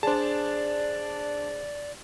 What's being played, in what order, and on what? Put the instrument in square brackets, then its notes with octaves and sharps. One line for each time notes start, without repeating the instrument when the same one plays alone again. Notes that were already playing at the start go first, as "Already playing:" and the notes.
[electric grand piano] D4 A5 [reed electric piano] G#4 C5 [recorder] D5